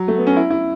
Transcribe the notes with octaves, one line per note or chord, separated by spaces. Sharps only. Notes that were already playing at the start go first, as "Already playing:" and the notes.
Already playing: F#3
A3
B3
C#4
E4
E4